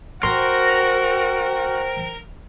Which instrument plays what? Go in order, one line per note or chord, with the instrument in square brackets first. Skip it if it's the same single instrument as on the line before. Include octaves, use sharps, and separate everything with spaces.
[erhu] F#4 [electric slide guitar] A#4 [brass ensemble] C5 G5 [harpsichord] C6